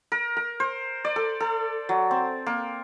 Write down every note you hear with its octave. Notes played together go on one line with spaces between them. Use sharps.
A#4
A#4
C5
D5
A4
A4
F#3
C4
A#3